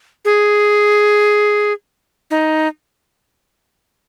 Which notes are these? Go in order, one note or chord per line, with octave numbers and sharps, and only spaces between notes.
G#4
D#4